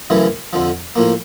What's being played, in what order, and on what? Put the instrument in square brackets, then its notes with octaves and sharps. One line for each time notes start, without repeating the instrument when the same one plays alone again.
[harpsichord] F#2 C#3 E3 A3
F2 D3 F3
A2 F3 A#3